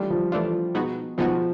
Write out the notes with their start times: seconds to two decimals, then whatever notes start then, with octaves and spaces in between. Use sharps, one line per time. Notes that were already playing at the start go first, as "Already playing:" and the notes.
Already playing: E3 G3 A3 D4 F4
0.10 F3
0.32 E3 A3 D4 F4
0.75 B2 G#3 B3 D#4 F#4
1.18 B2 F3 G#3 B3 D#4 F#4